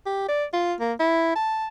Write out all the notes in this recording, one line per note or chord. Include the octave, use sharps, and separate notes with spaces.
G4
D5
F4
A#3
E4
A5